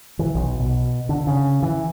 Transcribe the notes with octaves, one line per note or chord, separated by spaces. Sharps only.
E3
B1
B2
D3
C#3
E3